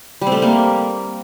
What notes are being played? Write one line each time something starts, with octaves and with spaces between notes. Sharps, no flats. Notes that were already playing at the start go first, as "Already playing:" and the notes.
G3
C4
A3
G3
A#3